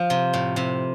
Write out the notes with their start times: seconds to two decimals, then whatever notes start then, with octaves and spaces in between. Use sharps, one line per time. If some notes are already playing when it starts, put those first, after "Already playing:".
Already playing: F3
0.10 C3
0.33 A2
0.56 C3